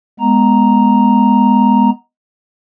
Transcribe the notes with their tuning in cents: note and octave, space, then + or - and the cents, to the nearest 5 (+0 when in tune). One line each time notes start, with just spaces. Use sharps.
G#3 +0 B3 +0 A#5 +0